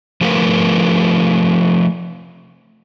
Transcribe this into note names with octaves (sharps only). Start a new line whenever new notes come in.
F3 F#3 A3 F4 A#4 B4